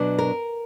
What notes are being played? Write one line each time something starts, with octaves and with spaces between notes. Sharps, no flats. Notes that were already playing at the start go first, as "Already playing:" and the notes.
Already playing: B2 F#3 D4
A#4